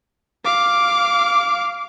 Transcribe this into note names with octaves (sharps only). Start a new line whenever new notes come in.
F5 D6